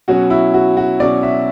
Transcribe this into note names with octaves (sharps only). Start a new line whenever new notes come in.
B2 F#3 C#4 F#4
E4
F#4
F#4
B2 F#3 C#4 D5
E5